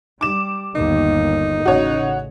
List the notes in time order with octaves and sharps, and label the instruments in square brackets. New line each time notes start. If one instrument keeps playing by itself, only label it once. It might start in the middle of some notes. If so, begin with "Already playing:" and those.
[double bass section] G3 [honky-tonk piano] D6 E7
[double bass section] G1 D#2 D#3 [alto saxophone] D#4
[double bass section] A1 C#3 [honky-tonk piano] F#4 C#5 D#5